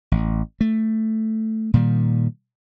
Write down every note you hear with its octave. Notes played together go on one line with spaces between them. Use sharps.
A1
A3
A#2 D#3 G3